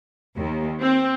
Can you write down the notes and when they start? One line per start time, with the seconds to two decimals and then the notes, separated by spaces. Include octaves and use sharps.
0.36 D#2
0.80 C4